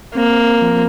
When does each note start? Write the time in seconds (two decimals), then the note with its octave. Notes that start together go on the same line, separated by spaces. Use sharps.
0.15 A#3 C4
0.62 F3